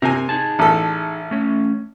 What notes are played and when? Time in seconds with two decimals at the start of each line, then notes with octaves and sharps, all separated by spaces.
0.02 C3 C4 A#4 G#5
0.29 D#4 G#4 A5
0.59 A1 A4
1.31 A3 C#4